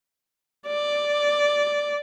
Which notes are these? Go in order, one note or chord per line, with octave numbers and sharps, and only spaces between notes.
D5